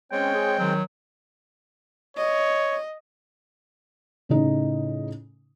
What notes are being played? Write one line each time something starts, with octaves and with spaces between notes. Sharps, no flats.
G#3 C4 C#4 C#5 G5
G#4
D#3 F#3
C#5 D#5
A2 C#3 D#4